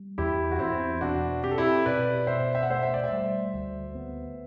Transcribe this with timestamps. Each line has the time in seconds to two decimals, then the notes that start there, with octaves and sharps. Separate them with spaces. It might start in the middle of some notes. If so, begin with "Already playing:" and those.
Already playing: G3
0.18 E2 E4 G4
0.51 F#4
0.59 E2 C4 E4
1.01 B2 D4 F#4
1.44 C4 G4
1.51 A4
1.58 E4 G4
1.86 B2 B4 D5
2.27 B2 C5 E5
2.55 E5
2.63 F#5
2.70 A3 C5 E5
2.83 E5
2.94 D5
3.04 C5 E5
3.11 G3
3.54 D2
3.95 B3